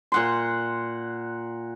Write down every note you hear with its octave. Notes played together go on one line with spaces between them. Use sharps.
A#2 F#5 C6